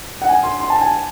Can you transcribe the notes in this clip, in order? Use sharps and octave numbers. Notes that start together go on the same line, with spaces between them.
F#5
G#5
C6
C6
A5
G#5